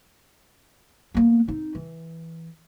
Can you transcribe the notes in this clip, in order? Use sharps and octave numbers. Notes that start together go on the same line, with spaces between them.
A#3 B3
C4 D#4
E3